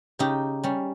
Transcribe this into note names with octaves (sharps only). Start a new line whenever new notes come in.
C#3 D#4 G4
G3 C#4